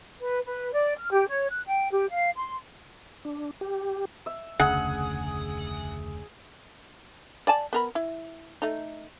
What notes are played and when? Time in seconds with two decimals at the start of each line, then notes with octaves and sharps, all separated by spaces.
0.19 B4
0.45 B4
0.73 D5
0.97 F6
1.11 G4
1.28 C#5
1.50 F#6
1.66 G5
1.92 G4
2.10 F5
2.36 C6
3.25 D4
3.61 G4
4.26 E5
4.60 F1 D2 C#3 G#4 F#5
7.47 D5 G#5 A5
7.73 B3 A#4 B5
7.95 E4
8.62 A3 D#4